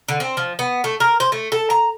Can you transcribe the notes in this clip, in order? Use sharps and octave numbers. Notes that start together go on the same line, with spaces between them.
D3
C4
F3
B3
A3
A#4
C5
A3
A4
A#5